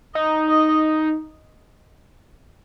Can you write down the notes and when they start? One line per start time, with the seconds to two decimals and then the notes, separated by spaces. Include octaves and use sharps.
0.15 D#4 D#5
0.49 D#5